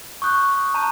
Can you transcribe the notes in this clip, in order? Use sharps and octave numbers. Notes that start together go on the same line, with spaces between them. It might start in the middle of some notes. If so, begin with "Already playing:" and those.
C#6 D#6 F#6 G6
A5 A#5 G6 D#7